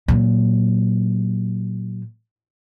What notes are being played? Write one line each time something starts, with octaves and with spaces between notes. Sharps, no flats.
A#2 F#3